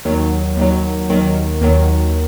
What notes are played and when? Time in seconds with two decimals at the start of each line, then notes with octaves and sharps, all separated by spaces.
0.05 D#2 D#3 F#3
0.57 D#2 D#3 F#3
1.09 D#2 D#3 F#3
1.61 D#2 D#3 F#3